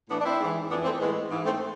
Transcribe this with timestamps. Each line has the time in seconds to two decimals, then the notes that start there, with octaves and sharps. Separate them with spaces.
0.10 A2 E3 B3 D4
0.20 D4
0.25 C4 E4
0.39 G#2
0.45 E3
0.70 F2 E3 B3 D4
0.84 A3 C4
0.99 A2 E3 G#3 B3
1.30 G#2 E3
1.45 A3 C4